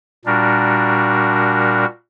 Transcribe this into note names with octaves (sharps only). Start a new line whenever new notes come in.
A#2 G3 D4 F#4 A#4